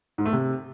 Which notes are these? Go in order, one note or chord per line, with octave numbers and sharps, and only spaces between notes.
G#2
A3
C3